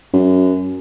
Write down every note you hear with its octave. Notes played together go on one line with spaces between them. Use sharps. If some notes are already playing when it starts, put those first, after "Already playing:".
F#2